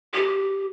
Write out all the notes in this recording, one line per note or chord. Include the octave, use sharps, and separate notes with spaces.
G4